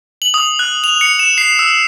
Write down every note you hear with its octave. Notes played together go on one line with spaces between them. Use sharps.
F#7
D#6
F#6
F7
C#7
E7
C7
E6